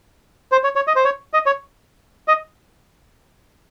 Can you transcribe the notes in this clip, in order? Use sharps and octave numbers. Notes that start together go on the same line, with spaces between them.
C5
C#5
C#5
D#5
C5
C#5
D#5
C#5
D#5